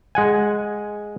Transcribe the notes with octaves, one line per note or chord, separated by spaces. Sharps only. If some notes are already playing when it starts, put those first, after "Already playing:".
G#3 F#5 G#5